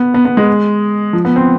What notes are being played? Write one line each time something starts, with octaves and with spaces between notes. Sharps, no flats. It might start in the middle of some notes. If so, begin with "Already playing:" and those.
Already playing: B3
B3
B3
G#3
F3
B3
C4